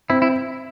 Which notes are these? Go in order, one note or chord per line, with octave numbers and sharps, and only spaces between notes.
C4 E4
E4